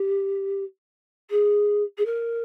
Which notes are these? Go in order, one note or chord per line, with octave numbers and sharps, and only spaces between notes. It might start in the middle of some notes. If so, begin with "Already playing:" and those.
Already playing: G4
G#4
G#4
A#4